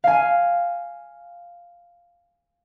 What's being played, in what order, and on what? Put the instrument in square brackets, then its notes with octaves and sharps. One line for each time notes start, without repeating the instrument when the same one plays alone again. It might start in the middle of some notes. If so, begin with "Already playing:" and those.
[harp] F5 G#5